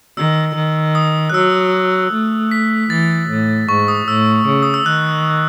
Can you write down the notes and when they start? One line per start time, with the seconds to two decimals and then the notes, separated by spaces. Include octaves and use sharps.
0.17 D#3 E6
0.55 D#3
0.95 D#6
1.30 F#6
1.34 F#3 E6
2.13 A3
2.51 B6
2.90 E3 A6
3.30 A2
3.69 G#2 C#6
3.88 D#6
4.07 A2 E6
4.46 C#3
4.63 D#6
4.74 E6
4.86 D#3 F#6